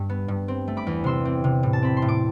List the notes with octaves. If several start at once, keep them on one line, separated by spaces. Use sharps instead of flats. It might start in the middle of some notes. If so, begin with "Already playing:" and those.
Already playing: G2
B3
G2
C4
A3
B5 D6
E2
C3 C6 E6
C4
C3
A2
A5
C4 B5
C6
A2
D6